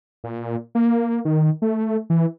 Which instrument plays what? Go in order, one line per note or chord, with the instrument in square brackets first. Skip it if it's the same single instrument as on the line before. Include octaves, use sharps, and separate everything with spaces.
[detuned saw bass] A#2
A#3
D#3
A3
E3